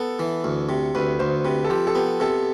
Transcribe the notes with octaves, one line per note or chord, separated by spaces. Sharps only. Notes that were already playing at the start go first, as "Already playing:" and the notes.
Already playing: B3 A4
E3
D2
C3
D2 B4
D2 C5
C3 B4
A4
F3 G4
A4
B3 G4
C3 A4